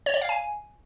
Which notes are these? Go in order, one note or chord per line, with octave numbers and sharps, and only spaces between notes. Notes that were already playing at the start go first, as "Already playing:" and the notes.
C#5
D5
F5
G#5